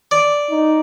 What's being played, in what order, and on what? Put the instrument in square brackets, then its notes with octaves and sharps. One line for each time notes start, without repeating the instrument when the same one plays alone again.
[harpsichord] D5
[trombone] D#4